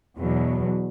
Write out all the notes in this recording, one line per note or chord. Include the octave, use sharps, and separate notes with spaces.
E2 B2 F#3